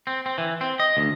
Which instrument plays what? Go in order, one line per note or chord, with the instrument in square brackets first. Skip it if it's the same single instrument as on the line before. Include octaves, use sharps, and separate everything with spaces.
[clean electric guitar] C4
C4
E3
C4
D#5
D2